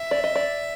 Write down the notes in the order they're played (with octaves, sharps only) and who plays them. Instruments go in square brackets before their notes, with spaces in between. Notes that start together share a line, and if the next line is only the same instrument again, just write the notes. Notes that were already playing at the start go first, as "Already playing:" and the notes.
Already playing: [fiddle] E5
[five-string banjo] D5
D#5
D5